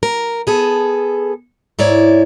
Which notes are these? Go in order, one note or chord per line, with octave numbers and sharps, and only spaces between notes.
A#4
B3 G#4 A4
G#2 E4 C#5 D5